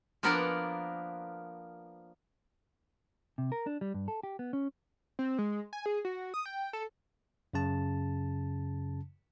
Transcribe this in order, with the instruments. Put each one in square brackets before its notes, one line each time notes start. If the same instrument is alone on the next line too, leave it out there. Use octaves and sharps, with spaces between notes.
[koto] F3 A#3 B3 D4 A#4 F#5
[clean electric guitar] C3
A#4
D4
G3
G2
A4
G4
B3
C#4
[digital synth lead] C4
G#3
G#5
G#4
F#4
D#6
G5
A4
[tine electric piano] F#2 C#3 A5